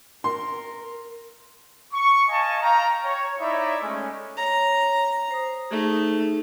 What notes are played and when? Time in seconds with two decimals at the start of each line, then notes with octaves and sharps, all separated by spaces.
0.24 A#4 C6
1.93 C#6
2.29 D#5 F5 G#5 A5 C#6
2.62 F5 G5 A#5
3.04 C#5
3.39 D#4 E4 C#5 D5 E5
3.81 G#3 A3 C#4
4.37 C#5 A#5
5.31 C5 D#6
5.71 A3 D#4 G#4